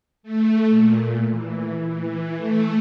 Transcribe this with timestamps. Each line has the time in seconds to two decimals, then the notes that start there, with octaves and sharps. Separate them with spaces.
0.23 A3
0.70 A#2
1.31 E3
1.87 E3
2.37 A3